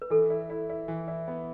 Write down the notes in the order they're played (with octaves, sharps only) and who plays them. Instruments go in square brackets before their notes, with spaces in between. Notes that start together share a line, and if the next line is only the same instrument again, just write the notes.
[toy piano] B4
[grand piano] E3 [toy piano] A4
[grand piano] E4
E4
E4
E3
E4
B3